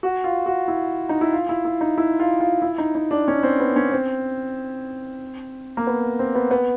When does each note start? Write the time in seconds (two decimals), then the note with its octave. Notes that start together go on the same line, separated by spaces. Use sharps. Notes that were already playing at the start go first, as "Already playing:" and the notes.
0.03 F#4
0.24 F4
0.46 F#4
0.68 E4
1.09 D#4
1.21 E4
1.33 F4
1.49 E4
1.65 E4
1.81 D#4
1.98 E4
2.20 F4
2.40 F4
2.62 E4
2.78 D#4
2.95 D#4
3.11 D4
3.28 C#4
3.43 C4
3.60 B3
3.76 C#4
3.92 C4
5.77 A#3
5.87 B3
6.19 C4
6.35 B3
6.51 B3